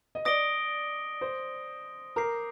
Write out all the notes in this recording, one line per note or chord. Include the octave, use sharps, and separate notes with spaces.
D#5
D5 D#6 A#6 D7 G7
C5
A#4 A#5 D6 G6 C7